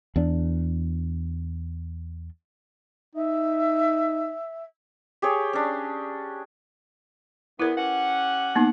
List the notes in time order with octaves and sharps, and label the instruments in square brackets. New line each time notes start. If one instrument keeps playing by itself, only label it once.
[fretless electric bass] E2 D4
[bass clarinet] D#4 [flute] E5
[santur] G4 G#4 C#5
C#4 D4
[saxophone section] E2 B3 [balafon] E4 A#4 B4
[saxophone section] C#4 G4 F#5
[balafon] A#3 B3 D#4